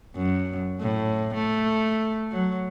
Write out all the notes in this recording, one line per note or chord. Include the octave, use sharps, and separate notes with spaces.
F#2
A2
A3
F#3